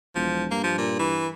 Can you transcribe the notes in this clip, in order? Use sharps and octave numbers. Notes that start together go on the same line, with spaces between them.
E1 F3
G2 A#3
F3
A#2
E3